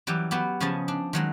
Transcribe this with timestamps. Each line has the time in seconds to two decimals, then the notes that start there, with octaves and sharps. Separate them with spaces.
0.07 E3 F#3 G3 G4
0.31 F#3 B3 F#4 G4
0.60 C#3 F3 C#4 G#4 D#5 A5
0.88 D4
1.13 D#3 F#3 G#3